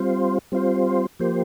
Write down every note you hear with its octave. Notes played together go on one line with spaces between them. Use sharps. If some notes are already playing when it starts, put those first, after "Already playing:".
Already playing: G3 C4 F4 C5
G3 C4 F4 C5
F3 A#3 G4 C5